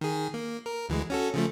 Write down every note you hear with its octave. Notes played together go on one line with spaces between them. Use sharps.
D#3 G#4
A#3
A#4
D2 E3 G#3
C#4 F#4 A4
C#3 F3 A3